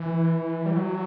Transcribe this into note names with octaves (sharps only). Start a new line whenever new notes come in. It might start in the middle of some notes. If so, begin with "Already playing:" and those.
Already playing: E3
G3
F#3